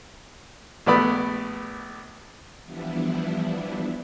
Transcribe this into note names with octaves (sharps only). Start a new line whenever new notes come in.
A#1 A3 B3 D5 B5 D#6
E3 F3 G3 B3 D4 E4